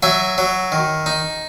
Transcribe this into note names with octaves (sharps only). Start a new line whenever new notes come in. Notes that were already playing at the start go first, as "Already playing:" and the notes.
F#3 E5 G#5
F#3
D#3
D#4